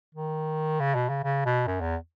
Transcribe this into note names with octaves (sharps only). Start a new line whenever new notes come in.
D#3
C#3
B2
C#3
C#3
B2
F#2
E2